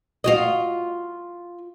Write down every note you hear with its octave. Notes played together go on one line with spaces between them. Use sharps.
F4 F#4 D#5